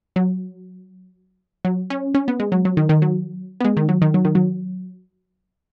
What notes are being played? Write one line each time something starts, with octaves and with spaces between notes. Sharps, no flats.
F#3
F#3
C#4
C#4
B3
G#3
F#3
F#3
D#3
D#3
F#3
B3
G#3
D#3
F#3
D#3
F#3
D#3
F#3